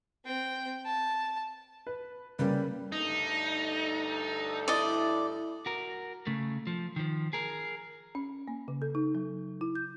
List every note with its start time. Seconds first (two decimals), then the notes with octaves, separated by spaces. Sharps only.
0.25 C4 G5
0.85 A5
1.87 B4
2.39 C#3 G3 A#3 B4
2.92 D2 G2 D#4 A4
4.68 E4 D5 D#5
5.66 F#4 A#4
6.27 C#3 A3
6.67 F3
6.96 D#3 F3
7.33 G#4 A#4
8.15 C#4
8.48 A#3
8.68 C#3
8.82 A4
8.95 D#4
9.15 F#3
9.61 E4
9.75 G6